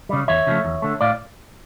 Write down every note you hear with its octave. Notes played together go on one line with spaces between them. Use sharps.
C#3 G3
E2 C#5 E5
C#3 F3 A3
E2
D3 A3
A2 D5 F5